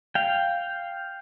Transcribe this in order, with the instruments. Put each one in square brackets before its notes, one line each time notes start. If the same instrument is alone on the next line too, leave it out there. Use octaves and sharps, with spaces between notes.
[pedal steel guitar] F5 G5